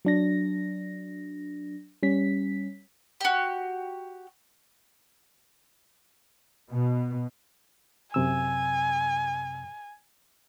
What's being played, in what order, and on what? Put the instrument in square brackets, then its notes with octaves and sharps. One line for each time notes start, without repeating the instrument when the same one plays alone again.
[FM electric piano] F#3 D4 A#6
G3 C#4 B6
[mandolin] F#4 G4
[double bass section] B2
[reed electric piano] F#2 C3 E6 [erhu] G#5